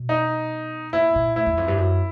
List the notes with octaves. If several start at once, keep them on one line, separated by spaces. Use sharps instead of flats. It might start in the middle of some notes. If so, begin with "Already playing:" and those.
Already playing: B2
D#4
A#2 E4
A#2
A2 E4
E2
F2
G2
F#2